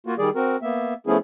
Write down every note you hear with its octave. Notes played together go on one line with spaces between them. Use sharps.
A#3 F4 F#4
D#3 G3 G#4 D5
C4 F#4 A#4
A#3 B3 E5
F3 A3 B3 C#4 E4 G#4